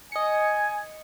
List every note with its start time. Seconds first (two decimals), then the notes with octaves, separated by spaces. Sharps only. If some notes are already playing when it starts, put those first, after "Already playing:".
0.12 D#5 G#5 C#7